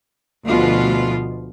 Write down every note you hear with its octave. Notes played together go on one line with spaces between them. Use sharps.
D2 B2 F3 F4